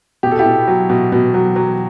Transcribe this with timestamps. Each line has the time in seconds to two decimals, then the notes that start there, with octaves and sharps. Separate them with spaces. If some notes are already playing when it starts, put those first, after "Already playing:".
0.23 B2 G4
0.31 A4
0.39 E4 G4
0.46 B2
0.68 F#3
0.90 B2
1.12 B2
1.34 F#3
1.56 F#3